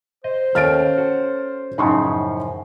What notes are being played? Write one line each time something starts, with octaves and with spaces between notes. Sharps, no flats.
C5 D#5
D#2 A3 C#4 F6 A6 D7
F#4 A4
F#2 A2 C#3 F3 D#4 C6 C#6